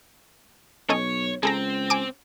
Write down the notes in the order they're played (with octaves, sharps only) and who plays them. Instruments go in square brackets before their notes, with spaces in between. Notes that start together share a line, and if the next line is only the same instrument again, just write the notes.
[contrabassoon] B1 [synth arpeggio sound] C#4 A4 D#5 [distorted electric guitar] C#5
[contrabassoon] C#2 [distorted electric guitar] C4 [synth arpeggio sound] G#4 A4 A#5
[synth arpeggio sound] G#5 D6